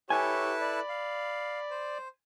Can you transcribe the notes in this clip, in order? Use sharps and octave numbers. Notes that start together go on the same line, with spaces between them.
E4 G4 A4 B4 C#5 G#5
D5 B5
F5
C5